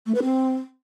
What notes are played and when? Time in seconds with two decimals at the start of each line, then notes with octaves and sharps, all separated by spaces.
0.06 A3
0.15 B4
0.23 C4